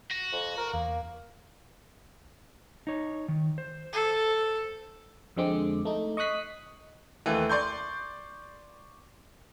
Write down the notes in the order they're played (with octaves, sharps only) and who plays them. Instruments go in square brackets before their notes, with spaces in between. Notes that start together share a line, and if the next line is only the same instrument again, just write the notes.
[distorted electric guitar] F#4 [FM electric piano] A#6
[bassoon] F2
A#4
[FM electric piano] E2 [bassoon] A#3
[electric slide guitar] D#4 C#5
D#3
C5
[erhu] A4
[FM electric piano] F2 D3 G#3 C4 D6
A3 D#4
D#5 C#6 D#6 F#6 B6 C7
[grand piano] D#2 E3 A3
D5 C6 C#6 G6